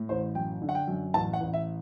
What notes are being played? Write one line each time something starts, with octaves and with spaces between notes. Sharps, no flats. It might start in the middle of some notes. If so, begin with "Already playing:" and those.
Already playing: A2
A1 C5
F#2 G5
D3
F#5
G5
F#2
A1 A5
F#5
A1
E5